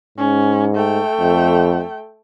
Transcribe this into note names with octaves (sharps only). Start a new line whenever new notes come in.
G#2 C#4
A3 G5
F2